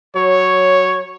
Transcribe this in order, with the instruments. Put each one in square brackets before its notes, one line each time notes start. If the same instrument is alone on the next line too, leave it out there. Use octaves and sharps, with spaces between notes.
[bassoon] F#3 [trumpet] C#5